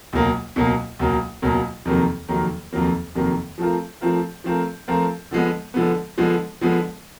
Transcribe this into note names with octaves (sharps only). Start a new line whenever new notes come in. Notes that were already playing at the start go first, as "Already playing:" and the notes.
C#2 B2 F#3 A#3
C#2 B2 F#3 A#3
C#2 B2 F#3 A#3
C#2 B2 F#3 A#3
F2 C3 D#3 F#3 A#3
F2 C3 D#3 F#3 A#3
F2 C3 D#3 F#3 A#3
F2 C3 D#3 F#3 A#3
F3 A3 C4 F4 A#4
F3 A3 C4 F4 A#4
F3 A3 C4 F4 A#4
F3 A3 C4 F4 A#4
D3 F3 G#3 B3
D3 F3 G#3 B3
D3 F3 G#3 B3
D3 F3 G#3 B3